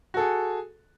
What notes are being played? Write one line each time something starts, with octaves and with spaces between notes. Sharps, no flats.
F#4 G#4 A4